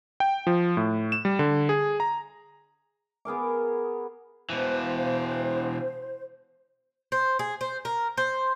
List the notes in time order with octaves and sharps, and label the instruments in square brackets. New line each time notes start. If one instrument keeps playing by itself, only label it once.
[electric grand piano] G5
F3
A2
E7
G3
D3
G#4
A#5
[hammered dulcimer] B3 G#4 A#4 D6
[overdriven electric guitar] B2 E3 [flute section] C5
[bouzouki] C5
G#4
C5
A#4
C5